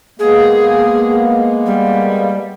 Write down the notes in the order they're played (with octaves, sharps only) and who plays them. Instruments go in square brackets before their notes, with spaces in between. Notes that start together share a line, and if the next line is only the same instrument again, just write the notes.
[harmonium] G#3 A#3 B3 [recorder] G#4
[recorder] G3